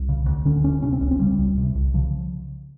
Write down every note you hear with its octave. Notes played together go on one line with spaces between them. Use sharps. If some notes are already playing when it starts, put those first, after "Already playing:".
Already playing: C2
C#3
D2
D3 C#4
D2 C#4
C3 C#4
C4
C#2 C#4
C4
C#3 G3
C#2
C3
C2
C#3 F3